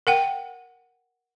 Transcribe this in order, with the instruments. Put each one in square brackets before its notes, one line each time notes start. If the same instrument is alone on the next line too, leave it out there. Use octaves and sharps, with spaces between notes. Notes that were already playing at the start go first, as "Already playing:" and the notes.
[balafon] A#4 F#5 G5